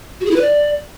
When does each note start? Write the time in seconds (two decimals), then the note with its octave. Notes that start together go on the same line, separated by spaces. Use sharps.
0.21 F#4
0.26 G#4
0.31 E4
0.36 B4
0.41 D5